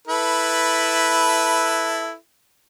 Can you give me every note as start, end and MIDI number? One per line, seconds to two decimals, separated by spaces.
0.08 2.14 64
0.08 2.14 69
0.08 2.14 71